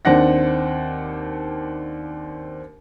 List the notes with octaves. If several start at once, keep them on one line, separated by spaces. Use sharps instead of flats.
D#2 C4 D4 F#5 A#6